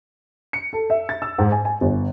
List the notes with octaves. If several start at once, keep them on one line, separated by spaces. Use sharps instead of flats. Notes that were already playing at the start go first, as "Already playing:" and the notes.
C#7
A4
E5
A6
E6
G#2
G#5
G#5
G1